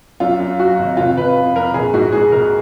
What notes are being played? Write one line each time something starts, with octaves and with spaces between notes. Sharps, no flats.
F#2 F4
F#2
F#3 F#4
G#1
F1 F4
F1 B4
F2
F2 A#4
A#1 G#4
G#2 F#4
G#2 G#4
A#1 A#4